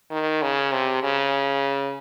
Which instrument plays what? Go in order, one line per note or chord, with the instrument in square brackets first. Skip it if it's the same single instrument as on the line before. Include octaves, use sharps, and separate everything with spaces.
[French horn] D#3
C#3
C3
C#3